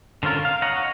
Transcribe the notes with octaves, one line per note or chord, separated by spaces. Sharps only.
D3 C4 C#4 F4 A#4
F5
C#5 D#5 F#5 A#5